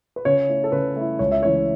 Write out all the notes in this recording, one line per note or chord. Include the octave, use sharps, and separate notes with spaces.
B4
C#3 C#5
A3 E4
A4
C#3 B4
A3 E4
C#2 C#5
E5
C#3 E3 A3 C#5